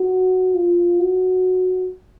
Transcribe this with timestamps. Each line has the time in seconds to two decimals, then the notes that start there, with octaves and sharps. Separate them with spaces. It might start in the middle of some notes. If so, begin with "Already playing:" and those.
Already playing: F#4
0.55 F4
1.00 F#4